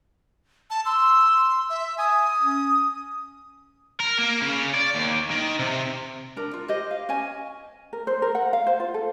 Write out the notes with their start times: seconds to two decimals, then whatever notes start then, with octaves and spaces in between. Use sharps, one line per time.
0.70 A5
0.86 C6 E6
1.70 E5
1.98 G#5 D#6
2.42 C#4
4.00 A#4
4.19 A#3
4.42 C#3
4.74 D5
4.95 D#2
5.30 D#3
5.59 C3
6.36 D4 A#4
6.54 F4
6.68 G4 C5 D#5
6.91 F5
7.09 C#4 D#5 G#5
7.93 A#4
8.07 C5
8.22 A#4
8.35 F#5
8.53 F5
8.67 C5
8.80 F4
8.94 A4